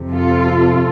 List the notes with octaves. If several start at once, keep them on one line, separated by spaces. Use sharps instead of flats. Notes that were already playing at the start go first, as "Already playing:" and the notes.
Already playing: F2 C3 F3
F4 A4